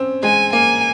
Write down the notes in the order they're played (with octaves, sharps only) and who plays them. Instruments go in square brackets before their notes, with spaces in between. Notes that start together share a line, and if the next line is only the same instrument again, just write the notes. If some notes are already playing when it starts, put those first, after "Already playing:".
Already playing: [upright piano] C4 C#4
[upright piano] G#3 [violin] G#5
[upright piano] A#3 [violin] G#5